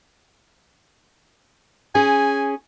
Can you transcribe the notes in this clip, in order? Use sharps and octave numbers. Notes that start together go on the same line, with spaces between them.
C#4 G#4 G#5